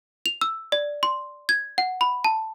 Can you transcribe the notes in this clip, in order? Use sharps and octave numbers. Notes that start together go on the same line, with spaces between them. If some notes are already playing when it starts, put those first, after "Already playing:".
F7
E6
D5
C6
G#6
F#5
B5
A5